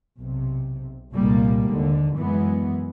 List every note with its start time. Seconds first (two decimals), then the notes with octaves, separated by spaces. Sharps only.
0.17 B1 C3
1.13 F1 C2 A#2 G3 G#3 A#3
1.68 D#2 D3
2.17 F#2 E3 G#3 B3